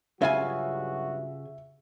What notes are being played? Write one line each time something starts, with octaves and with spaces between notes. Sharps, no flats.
G2 C#3 F#3 F4 F#4 E5 G#5